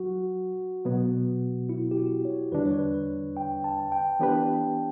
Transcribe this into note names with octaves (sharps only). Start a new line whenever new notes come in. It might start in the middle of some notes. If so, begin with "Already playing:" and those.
Already playing: F#3 F#4
B2 F#3 B3
E4
G4
F#4
C#5
E2 D3 G3 D4 B4
C#5
B4
B4
G5
A5
G5
E3 B3 D4 G4 B4